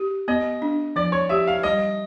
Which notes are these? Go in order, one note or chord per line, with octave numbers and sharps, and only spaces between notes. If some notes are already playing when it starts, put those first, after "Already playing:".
Already playing: G4
B3 D#5
D4
F3 D5
C#5
G4 E5
F5
G3 D#5